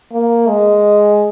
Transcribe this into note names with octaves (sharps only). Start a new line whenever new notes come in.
A#3
G#3